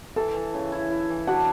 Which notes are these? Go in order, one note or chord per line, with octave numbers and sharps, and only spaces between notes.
E3 A4 A5
E3
C#3
E4
E4
E3
D4 F#4 F#5